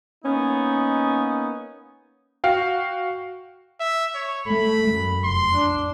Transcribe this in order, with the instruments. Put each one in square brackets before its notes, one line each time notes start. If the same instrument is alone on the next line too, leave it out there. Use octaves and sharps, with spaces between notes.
[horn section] A#3 B3 C#4 D#4
[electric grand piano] F#4 F5 G5
[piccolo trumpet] E5
C#5
[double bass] A3 [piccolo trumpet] B5
[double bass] F#2
[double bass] F1 [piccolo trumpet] C6
[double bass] D4